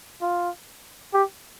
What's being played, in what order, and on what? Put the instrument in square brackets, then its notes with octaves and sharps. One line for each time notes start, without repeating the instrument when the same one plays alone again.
[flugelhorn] F4
G4